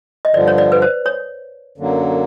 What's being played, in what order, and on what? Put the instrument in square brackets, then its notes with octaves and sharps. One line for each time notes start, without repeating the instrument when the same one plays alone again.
[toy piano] D#5
[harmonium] G2 D3 F3 [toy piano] D5
[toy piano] C#5
D5
B4
C5
C#5
[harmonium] F#2 D3 F#3 A#3